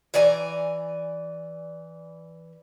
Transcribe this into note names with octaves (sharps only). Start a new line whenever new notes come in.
E3 D5 G#5 A#5